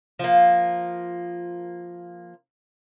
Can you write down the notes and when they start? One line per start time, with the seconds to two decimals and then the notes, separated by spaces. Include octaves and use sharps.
0.19 F3 A#3